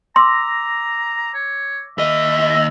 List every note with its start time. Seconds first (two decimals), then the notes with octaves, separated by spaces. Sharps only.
0.16 A#5 C6 D6 E6 A#6
1.34 C#5
1.98 D#2 D#5 E5
2.50 E6 A#6